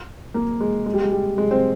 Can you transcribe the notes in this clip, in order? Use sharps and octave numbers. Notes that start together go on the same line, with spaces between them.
A#3
G#3
G#3
G3
G#3
G3
G#3
C4